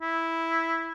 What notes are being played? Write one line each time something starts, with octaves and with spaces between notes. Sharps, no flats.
E4